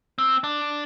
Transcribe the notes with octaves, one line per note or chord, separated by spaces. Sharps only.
C4
D4